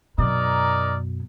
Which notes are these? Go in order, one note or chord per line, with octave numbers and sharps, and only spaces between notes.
F#2 B2 D#4 A#4 D5